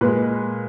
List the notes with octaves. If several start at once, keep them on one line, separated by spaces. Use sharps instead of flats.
A#2 G#3 B4